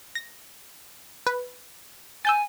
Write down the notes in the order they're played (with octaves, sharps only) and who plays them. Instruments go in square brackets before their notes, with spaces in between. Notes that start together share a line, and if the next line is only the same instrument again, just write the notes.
[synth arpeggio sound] A#6
B4
[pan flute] G#5 [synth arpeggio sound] E6 G6 A6